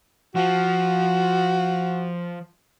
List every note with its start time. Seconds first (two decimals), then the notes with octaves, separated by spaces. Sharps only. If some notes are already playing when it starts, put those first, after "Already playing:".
0.35 F3 F#4